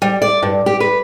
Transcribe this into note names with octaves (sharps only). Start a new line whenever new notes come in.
G3
D5
G2
G4
B4